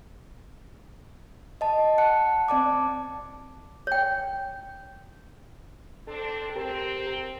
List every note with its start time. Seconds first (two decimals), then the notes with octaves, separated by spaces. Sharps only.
1.61 D#5 A5
1.98 F#5 A5 F#6 C#7
2.48 C4 D5 A5 D6
3.87 C#5 G5
6.07 C4 D4 A4
6.56 C4 G4 A#4